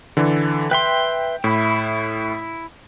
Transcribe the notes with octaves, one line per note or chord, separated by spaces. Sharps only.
D3 E3 A4
B4 E5 G5 C6
A2 E4 B5